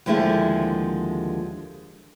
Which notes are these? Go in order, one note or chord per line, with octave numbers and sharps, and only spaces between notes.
D#2 D3 F3 G#3 A3 E4